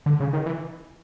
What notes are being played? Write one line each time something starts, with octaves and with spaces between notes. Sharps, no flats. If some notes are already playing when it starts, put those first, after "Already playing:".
D3
C#3
D#3
E3